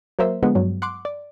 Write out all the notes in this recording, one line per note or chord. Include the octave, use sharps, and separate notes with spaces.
F#3 A#3 A#4 C5 E5
D3 F3 G#3 B3
G2 F#3
F#5 C6 D6
D5